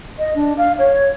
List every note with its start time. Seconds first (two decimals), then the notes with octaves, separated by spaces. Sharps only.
0.19 D#5
0.35 D4
0.57 F5
0.79 C#5